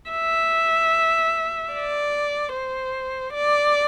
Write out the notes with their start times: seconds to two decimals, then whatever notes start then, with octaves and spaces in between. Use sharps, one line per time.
0.11 E5
1.73 D5
2.53 C5
3.33 D5